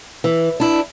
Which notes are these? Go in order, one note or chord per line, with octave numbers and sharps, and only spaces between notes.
E3
D4 E4